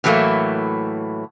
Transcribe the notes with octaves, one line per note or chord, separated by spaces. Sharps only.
A2 E3 F#3 G3 A3 A#3